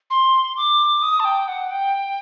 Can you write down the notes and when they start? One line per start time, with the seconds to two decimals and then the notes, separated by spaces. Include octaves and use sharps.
0.10 C6
0.56 D6
1.02 D#6
1.20 A5
1.25 G5
1.48 F#5
1.71 G5